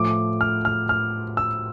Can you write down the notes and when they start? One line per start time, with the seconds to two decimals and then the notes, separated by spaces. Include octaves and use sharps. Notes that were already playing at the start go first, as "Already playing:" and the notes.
Already playing: A2 F3 A3 D6
0.41 F6
0.65 F6
0.89 F6
1.37 E6